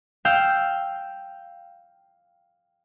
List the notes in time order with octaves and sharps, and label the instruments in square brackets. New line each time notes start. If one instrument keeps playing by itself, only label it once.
[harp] F5 G5 E6 F6 G6